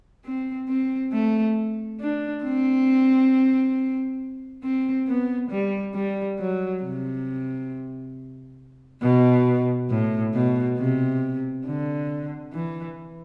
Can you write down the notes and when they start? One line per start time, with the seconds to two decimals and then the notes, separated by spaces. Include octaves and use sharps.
0.24 C4
0.68 C4
1.12 A3
2.00 D4
2.43 C4
4.63 C4
5.07 B3
5.50 G3
5.94 G3
6.39 F#3
6.83 C3
9.01 B2
9.90 A2
10.34 B2
10.77 C3
11.65 D3
12.53 E3